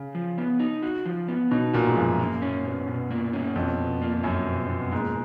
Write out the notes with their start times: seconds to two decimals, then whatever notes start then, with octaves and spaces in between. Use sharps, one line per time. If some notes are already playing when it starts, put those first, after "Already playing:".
Already playing: C#3
0.15 F3
0.38 B3
0.59 D#4
0.82 F#4
1.06 F3
1.28 B3
1.51 B2 D#4
1.74 A#2 F#4
1.87 G#2
1.96 F#2 F3
2.19 A#3
2.42 C#4
2.65 B2
2.87 B2
3.10 A#3
3.33 C#4
3.56 F2 B2
3.78 B2
4.02 A#3
4.23 F#2 C#4
4.47 B2
4.70 B2
4.91 G#2 A#3